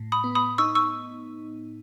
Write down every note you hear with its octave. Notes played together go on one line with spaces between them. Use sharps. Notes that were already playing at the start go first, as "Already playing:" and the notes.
Already playing: A2
B5 D#6
B3
B5 D#6
D#4 C#6 E6
C#6 E6